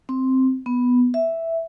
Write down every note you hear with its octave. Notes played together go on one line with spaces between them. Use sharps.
C4
B3
E5